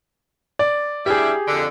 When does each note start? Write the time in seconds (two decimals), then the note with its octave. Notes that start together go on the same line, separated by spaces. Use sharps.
0.59 D5
1.06 G3 D4 E4 G4 G#4
1.48 F2 D3